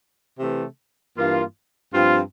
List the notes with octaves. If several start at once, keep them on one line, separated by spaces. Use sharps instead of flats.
C3 E3 A3
G2 E3 A#3 F4
G2 F3 C4 F4